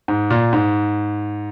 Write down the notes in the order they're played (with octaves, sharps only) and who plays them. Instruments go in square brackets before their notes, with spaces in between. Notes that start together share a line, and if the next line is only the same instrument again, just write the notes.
[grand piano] G#2
A#2
G#2